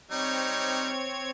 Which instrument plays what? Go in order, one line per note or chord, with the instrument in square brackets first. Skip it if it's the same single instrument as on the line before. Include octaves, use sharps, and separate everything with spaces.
[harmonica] G3 D#4 [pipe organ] C4 C#5 G#6